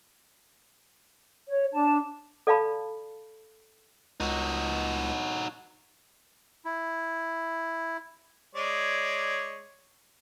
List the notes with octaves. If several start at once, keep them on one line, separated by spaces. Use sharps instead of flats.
C#5
D4 A5
A4 D5 F5 A5 B5
C#2 D#4 F#4
E4
G#3 C#5 D5